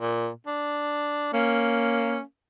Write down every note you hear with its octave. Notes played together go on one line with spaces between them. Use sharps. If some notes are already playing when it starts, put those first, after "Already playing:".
A#2
D4
A#3 C#4